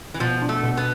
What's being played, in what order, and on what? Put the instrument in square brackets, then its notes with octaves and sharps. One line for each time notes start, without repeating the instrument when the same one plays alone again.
[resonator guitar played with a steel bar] E3
[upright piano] B2 [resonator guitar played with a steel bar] F3
[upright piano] D4
[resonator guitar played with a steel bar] A3
[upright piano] B2
[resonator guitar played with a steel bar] B3